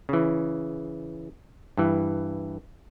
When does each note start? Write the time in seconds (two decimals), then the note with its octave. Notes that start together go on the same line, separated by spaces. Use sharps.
0.09 C#3 E3
1.78 G2 E3